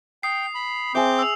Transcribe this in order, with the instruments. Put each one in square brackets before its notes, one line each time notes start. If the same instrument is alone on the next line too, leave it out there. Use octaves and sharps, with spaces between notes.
[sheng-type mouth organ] G5 [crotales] D#6 C7
[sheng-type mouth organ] B5
[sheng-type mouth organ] C4 D6 G6 [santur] G#4 E5
[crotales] E6 F7